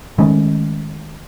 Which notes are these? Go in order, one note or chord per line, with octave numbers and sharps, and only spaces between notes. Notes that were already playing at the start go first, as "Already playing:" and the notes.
D#3 G#3 A3 C#4